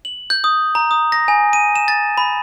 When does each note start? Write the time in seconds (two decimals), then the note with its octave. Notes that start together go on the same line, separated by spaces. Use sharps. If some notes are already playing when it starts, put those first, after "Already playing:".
0.05 F#7
0.30 G6
0.44 D#6
0.75 A#5
0.91 D#6
1.12 A#6
1.28 G#5
1.53 D#7
1.75 E7
1.88 A6
2.18 B5